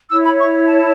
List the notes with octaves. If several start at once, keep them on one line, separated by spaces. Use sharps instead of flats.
E4 C#5 E6
B5
C#6
A5